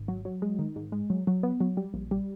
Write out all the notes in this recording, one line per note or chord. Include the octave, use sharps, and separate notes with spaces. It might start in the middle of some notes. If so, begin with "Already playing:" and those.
Already playing: G#1
F#3
F#3
G#3
D#3
G#2
G#3
F#3
F#3
B3
F#3
G3
A#1
G3